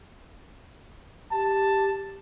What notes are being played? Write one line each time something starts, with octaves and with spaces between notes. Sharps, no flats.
G4 A5